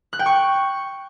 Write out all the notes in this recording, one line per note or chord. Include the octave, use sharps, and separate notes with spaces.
F#6
G5
C#6